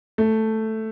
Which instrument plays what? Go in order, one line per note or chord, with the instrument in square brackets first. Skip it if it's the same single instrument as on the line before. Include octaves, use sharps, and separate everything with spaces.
[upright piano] A3